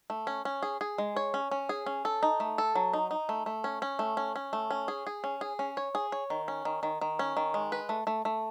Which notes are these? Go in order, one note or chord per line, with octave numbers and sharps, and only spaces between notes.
A3
C#4
C#4
G#4
G#4
G#3
C#5
C#4
C#4
G#4
C#4
A4
D#4
A3
A4
F#3
D#4
D#4
A3
A3
C#4
C#4
A3
C#4
C#4
A3
C#4
G#4
G#4
C#4
G#4
C#4
C#5
G#4
C#5
D#3
C#4
D#3
D#3
D#3
C#4
D#3
G#3
B4
A3
A3
A3